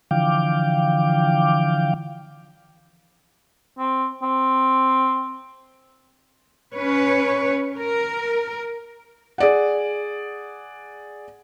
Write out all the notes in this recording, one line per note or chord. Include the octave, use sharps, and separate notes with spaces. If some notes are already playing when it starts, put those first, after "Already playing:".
D3 E3 F3 F5 G5 D6
C4
C4
C#4 B4 C#5
A#4
G#4 D5 F#5